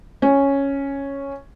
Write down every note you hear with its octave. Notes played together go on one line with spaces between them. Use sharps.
C#4